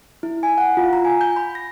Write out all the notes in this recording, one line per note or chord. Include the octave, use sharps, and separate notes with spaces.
E4
G#5
F#5
F4
A#5
G#5
G6
B5
A#6